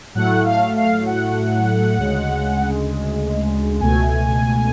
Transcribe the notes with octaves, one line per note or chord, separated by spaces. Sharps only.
A2 F#3 A3 F#5
F5
F5
F#5
D2 C#3 G#3
C#2 B2 A3 G#5